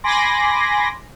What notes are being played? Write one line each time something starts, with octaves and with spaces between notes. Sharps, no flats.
G#5 B5 C6 D6 A#6